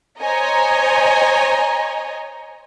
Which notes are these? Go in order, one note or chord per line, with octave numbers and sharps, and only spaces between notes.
C5 C#5 D#5 G#5 A#5